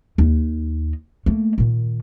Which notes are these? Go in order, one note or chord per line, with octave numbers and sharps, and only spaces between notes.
D#2 D#4
A3 A#3
A#2 D#3